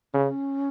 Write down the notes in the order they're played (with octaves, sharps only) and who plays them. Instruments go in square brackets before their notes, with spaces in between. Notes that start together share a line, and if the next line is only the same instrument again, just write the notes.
[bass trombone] C#3 [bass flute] C#4